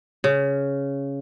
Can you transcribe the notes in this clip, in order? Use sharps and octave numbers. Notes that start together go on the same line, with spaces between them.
C#3